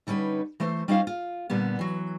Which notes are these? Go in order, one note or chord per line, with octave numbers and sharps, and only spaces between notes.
D3 G3 C#4 D#4 B4
E3 A3 C5
G3 C#4 D#4 F4 C5 F5
F4
A#2 D3 G3 B3
E3 F#3